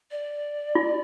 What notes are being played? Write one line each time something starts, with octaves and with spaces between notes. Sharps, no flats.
D5
F4